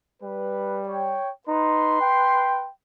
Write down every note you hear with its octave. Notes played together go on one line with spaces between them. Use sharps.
G3 B4
C#5 G5
D#4 B4 C6
G5